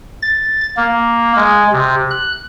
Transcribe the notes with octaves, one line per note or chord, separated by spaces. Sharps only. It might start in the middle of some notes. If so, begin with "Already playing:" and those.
A6
A#3
G#3
C3
F#6